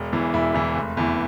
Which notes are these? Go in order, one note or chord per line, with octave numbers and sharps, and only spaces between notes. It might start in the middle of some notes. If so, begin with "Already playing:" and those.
Already playing: E1
E2 E3
E1 E4
E2 E3
F1
E2 E3